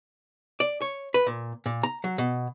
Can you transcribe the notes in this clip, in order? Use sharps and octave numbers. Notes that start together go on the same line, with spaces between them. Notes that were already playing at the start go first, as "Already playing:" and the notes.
D5
C#5
B4
A#2
A#2
A#5
F#3
B2